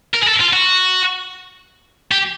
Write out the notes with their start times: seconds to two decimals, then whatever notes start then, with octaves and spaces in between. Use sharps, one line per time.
0.14 A#4
0.22 G#4
0.26 A4
0.40 F4
0.53 F#4
2.11 G4